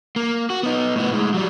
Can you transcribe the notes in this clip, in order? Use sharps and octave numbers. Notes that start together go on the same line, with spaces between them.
A#3
F#4
B3 D#4
A2 B3
A2 G#3
F#3 G3